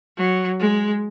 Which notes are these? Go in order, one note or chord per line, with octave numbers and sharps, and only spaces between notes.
F#3
G#3